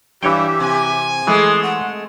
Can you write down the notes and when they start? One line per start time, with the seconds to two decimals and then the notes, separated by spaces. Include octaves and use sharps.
0.23 G2 E3 G3 G4 C#5 E5 G5
0.60 C3 G#5
1.27 E3 G#3 A3 D#6
1.63 F#5